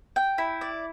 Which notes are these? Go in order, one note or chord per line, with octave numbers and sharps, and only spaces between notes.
G5
E4
D5